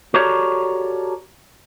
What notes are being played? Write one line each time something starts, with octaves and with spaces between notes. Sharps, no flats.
F#4 G4 A4 A#4 C#5 D5